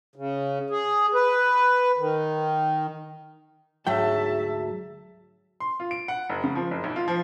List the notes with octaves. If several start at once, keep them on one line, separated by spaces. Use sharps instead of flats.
C#3
G#4
B4
D#3
D2 G#2 F#3 E5 G5 A5
C6
F4
D7
F#5
F#1
C#3
F3
F#1
B1
F4
F3